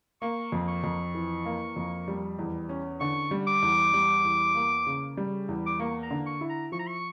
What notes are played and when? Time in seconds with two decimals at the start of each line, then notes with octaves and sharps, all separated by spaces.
0.22 A#3 C#6
0.52 F2
0.68 C#6
0.84 F2
1.15 E3
1.45 A#3
1.76 F2
2.08 G3
2.39 E2
2.69 C#4
3.01 D3 C#6
3.31 G3
3.47 D6
3.62 E2
3.94 G3
4.24 E2
4.55 A#3
4.87 C#3
5.17 G3
5.49 E2
5.66 D6
5.79 A#3 C#6
6.03 A#5
6.11 D3
6.26 C#6
6.41 E4
6.50 A#5
6.72 F3 C#6
6.79 A#5
6.87 C#6